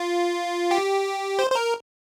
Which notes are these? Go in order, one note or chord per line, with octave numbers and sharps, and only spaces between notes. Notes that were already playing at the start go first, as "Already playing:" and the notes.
Already playing: F4
G4
C5
C5
A#4